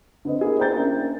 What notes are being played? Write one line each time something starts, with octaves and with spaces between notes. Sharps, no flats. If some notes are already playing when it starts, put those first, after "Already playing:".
D3 C4 B4 D#5
A#3 B3 E4 G#4 B4
C5 E5 G5 A#5 G6 A6
A#3 C#4 D4 E5